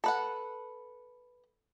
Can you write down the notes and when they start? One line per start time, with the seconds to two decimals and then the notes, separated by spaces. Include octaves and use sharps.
0.04 A4 B4 F#5